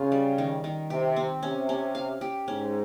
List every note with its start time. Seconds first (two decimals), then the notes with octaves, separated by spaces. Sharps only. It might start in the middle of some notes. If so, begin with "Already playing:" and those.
Already playing: C#3 C#4 F4
0.12 G3
0.38 D#3
0.64 D#3
0.90 C3 G4
1.16 C4
1.42 C3 C#4
1.69 C#4
1.95 F5
2.21 G4
2.48 G#2 C#4